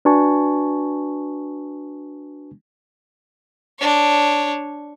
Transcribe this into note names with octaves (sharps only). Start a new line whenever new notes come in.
D4 F#4 B4 G#5 A5 C#6
D4 C#5